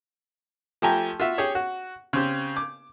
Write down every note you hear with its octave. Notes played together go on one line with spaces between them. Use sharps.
F3 A3 G4 G5 G#5 A#5
F4 F#4 E5
G4 G#4 C#5
F#4
C#3 C4 G4
D6